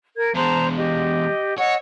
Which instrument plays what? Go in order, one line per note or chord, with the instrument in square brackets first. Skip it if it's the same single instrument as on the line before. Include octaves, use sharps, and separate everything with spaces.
[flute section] A#4 G#6
[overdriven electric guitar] E2 G#3 [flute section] C5 A5 A#5
[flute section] G4 D#5
[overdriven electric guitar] C#5 [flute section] D#5 F#5 E6